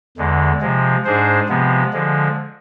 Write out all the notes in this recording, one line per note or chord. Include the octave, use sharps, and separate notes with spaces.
E2 D3 G#3
C3 F3 G#3
G#2 G#3 D4 G#4 C5
C3 F3 G#3 B3
D3 F3 G#3